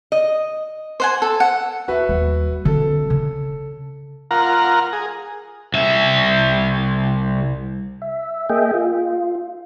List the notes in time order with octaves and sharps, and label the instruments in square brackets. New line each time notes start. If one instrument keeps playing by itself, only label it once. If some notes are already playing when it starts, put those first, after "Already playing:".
[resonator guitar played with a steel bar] D#5
[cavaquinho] C5 F#5 G#5
A4
F#5
[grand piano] F#4 B4 E5
[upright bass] D#2 G3
[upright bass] D3 C4 [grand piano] A4
[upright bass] C#3
[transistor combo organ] F4 A#4 F#5 A#5
G#4
[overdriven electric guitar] C2 E5
[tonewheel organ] E5
A#3 G#4 D#5 E5 G5
F4